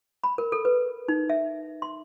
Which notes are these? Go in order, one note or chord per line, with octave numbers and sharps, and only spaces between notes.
B5
A#4
A4
B4
D#4
E5
C6